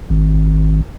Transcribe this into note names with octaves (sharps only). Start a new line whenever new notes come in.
G#1